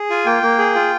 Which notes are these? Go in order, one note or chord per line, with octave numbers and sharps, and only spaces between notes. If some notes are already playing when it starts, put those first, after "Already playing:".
Already playing: G#4
F4 G#5
A#3 G5
A#3
G#4
F4